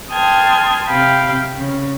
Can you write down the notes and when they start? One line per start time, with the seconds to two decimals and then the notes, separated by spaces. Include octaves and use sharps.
0.13 G5 A5 C6 D#6 F6 G#6
0.88 C3 F5 G5 B5
1.58 C#3